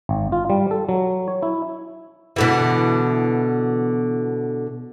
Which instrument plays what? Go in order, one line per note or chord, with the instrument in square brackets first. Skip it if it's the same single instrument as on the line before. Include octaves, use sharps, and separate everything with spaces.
[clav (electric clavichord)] G#1
F4
G3
A4
F#3
C#5
E4
[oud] B2 D3 E3